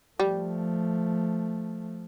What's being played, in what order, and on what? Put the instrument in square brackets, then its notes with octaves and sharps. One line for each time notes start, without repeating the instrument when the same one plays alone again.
[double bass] F3 A3 [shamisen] G3